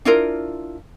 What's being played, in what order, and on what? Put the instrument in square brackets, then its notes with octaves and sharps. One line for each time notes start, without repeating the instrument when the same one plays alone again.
[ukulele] D4 E4 F4 A#4